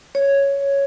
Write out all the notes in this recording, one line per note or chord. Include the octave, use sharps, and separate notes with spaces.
C#5